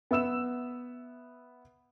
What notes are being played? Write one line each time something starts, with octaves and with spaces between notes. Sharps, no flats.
B3 E5 E6 E7